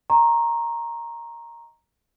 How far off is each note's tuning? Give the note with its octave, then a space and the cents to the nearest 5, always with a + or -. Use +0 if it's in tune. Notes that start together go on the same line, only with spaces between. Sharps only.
D#5 +0 A#5 +0 C#6 -45